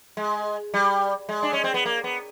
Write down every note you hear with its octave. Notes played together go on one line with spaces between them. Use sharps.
G#3
G3
G#3
D4
C#4
C4
B3
A#3
B3